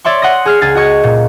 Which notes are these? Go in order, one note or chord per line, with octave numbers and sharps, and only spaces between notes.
C#5 D5 E5 C6 C#6
F#5 C6 D#6 A#6
G#4 F6 C7
C#2 G#4 A6
F#4 D#5 C#6 G#6
A#2